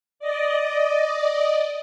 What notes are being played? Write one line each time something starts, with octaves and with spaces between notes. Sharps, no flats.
D5 D#5